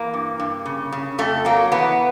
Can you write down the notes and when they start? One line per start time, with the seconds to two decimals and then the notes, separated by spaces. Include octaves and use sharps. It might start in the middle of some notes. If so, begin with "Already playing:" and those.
Already playing: E3 A#3
0.14 G2
0.40 G2
0.66 C#3
0.92 C#3
1.18 F2 A3
1.45 F#3 A#3
1.72 E3 B3